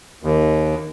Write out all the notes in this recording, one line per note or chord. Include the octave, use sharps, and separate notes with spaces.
D#2